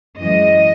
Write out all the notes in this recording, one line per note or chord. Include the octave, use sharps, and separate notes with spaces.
F#2 E3 G#3 D#5